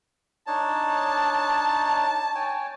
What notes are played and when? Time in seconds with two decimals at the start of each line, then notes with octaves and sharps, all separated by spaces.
0.47 D4 D#4 C#5 A5
2.35 C#5 G5 G#5